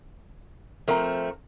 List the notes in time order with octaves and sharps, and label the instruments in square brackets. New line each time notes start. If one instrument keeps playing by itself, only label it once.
[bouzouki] F3 A3 C4 [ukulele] A#4 A#5